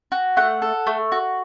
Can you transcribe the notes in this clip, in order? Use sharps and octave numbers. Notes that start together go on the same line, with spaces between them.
F#4
A3 F#5
A4
A3
F#4